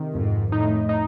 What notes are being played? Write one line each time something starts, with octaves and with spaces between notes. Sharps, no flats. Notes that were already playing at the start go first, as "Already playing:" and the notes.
Already playing: C3 D#3
F2 G#2
A2 D#4
D#4